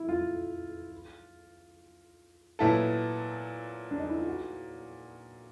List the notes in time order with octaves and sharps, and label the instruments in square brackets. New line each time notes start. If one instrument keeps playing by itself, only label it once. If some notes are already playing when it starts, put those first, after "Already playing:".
Already playing: [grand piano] E4
F4
[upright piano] A#2 F#3 B3 E4 A4
[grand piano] D4
D#4
E4
F4
F#4